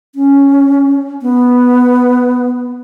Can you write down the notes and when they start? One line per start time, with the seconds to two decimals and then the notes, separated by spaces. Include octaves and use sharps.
0.15 C#4
1.22 B3